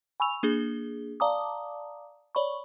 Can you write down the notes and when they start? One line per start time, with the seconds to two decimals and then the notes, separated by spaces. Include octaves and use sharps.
0.20 G#5 B5 C#6 E6 F7
0.43 A#3 D4 G#4 G7
1.20 D5 F5 A5 A#5 D6 D#6
2.35 C#5 D5 B5 C#6